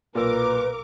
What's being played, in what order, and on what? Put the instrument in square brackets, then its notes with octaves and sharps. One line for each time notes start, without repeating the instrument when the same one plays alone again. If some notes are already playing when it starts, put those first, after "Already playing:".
[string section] B1 A#4 D6 [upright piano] A#2 E6 [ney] B4